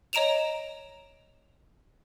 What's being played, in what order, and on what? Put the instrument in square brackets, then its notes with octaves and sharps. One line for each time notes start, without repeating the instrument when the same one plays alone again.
[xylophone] C#5 D#5 A#5 D7 E7 F7